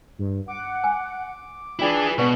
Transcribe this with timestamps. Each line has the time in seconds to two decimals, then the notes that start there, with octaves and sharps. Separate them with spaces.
0.19 G2
0.48 F#5 D6
0.84 G#5
1.79 D4 E4 F4 G#4 B4 G5
2.18 B2 B4 D5 F#5 C#6